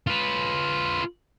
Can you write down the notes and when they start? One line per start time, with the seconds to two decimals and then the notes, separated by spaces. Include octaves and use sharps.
0.07 F4 B4